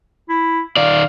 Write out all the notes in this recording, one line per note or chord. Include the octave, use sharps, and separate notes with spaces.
E4
D#3 D5 F5